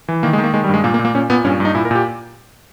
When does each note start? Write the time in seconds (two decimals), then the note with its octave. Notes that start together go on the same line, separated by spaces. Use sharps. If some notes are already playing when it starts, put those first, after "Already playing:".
0.08 E3
0.23 D#3 A#3
0.33 G#3
0.38 D#3
0.44 A#3
0.54 D#3 G#3
0.64 G3
0.69 G2 G#3
0.84 A#2 A#3
0.94 A#3
0.99 A#2
1.05 A#3
1.15 A#2 C#4
1.30 A#2 B3
1.44 G2 C#4
1.60 G2 D#4
1.75 A#2 E4
1.85 A#4
1.91 A#2 G4